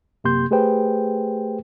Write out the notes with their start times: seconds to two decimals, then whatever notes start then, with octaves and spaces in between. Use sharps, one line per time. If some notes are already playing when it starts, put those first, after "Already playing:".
0.24 F#2 C3 A#3 G4 C6 G6
0.51 A3 G4 G#4 B4 C5 G5